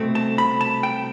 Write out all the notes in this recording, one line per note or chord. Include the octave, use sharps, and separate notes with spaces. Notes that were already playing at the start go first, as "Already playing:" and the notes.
Already playing: C2 B2 A3 C4
A5
B5
A5
G5